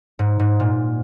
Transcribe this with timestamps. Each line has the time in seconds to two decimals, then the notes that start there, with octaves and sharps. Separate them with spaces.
0.19 G#2
0.39 G#2
0.59 A#2